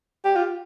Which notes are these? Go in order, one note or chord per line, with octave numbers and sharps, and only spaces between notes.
G4
F4